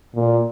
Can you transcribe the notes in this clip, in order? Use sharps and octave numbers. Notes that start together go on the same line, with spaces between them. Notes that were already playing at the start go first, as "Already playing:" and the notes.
A#2